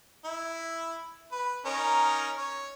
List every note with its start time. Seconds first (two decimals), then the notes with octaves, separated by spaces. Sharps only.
0.24 E4
1.31 B4
1.65 C#4 D#4 A#4
2.37 C#5